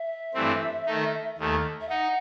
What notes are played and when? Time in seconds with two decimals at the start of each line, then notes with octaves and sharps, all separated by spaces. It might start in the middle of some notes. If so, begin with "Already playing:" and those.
Already playing: E5
0.34 G2 E3 A3 C4
0.86 D#3 A3 D#4
1.38 D#2 D#3 A3
1.81 E5
1.89 D#4 F#5